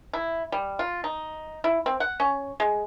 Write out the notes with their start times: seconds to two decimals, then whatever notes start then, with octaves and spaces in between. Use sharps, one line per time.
0.13 E4
0.52 G3
0.79 F4
1.04 D#4
1.64 E4
1.86 C4
2.00 F#5
2.20 C#4
2.60 G#3